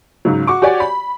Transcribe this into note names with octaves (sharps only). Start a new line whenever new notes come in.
G#2 C#3 F#3
F#4 C#6 D6
F#4 G4 C#5 D5 G#5
B5